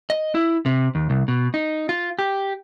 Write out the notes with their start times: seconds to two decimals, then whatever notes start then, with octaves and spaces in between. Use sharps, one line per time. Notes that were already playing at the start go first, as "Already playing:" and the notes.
0.10 D#5
0.35 E4
0.66 C3
0.95 D#2
1.10 C2
1.28 B2
1.54 D#4
1.89 F4
2.19 G4